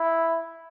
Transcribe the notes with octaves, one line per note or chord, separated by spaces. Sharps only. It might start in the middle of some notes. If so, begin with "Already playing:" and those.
Already playing: E4